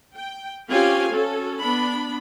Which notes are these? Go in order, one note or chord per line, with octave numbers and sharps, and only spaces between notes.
G5
C4 C#4 F4 G4 F5 G#5
C#4 F#4 A4
B3 D4 B5